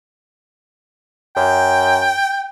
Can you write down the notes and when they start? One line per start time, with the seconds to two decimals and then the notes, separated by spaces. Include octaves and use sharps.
1.36 F#2 G5